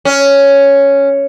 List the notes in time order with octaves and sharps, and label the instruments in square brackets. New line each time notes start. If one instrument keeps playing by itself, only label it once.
[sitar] C#4